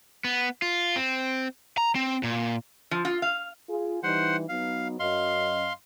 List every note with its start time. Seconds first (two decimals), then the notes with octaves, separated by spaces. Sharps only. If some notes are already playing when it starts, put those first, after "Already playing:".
0.24 B3
0.62 F4
0.96 C4
1.78 A#5
1.95 C4
2.23 A#2
2.91 F3
3.05 F4
3.22 F5
3.69 F4 G#4
4.03 E3 G3 D#4 C5 F#5
4.49 F#3 B3 D#4 F5
5.00 F#2 D#5 F5 C6